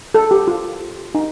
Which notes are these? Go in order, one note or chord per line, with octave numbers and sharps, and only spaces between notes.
A4
G4
F4
D#4